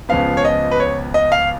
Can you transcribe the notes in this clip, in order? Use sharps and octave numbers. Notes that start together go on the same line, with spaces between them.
C#2 C#3 F3 B3 F5
C#5
D#5
B4
C#5
D#5
F5